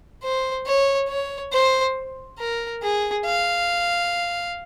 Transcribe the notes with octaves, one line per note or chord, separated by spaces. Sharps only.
C5
C#5
C#5
C5
A#4
G#4
F5